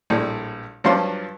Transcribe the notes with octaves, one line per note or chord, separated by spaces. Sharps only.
A#1 A2 G3
G2 F3 F#3 F4 D5 C6